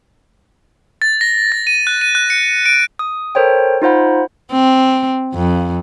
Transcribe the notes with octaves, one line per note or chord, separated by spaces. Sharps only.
A6
A#6
A6
D#7
F#6
D#7
F#6
C#7
D7
D#6
A4 A#4 C5 C#5 G5
D#4 F4 C5 F#5 B5
C4
F2